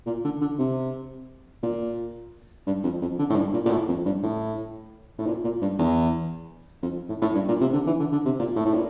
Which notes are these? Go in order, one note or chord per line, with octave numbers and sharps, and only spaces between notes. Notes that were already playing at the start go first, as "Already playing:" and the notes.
A#2
D3
D3
C3
A#2
G2
F2
F2
D3
A2
G2
A#2
A#2
A2
F2
G2
A2
A2
A#2
A#2
G2
E2
F2
A2
A2
G2
A#2
C3
D3
E3
D3
D3
C3
A#2
A2
A2
A#2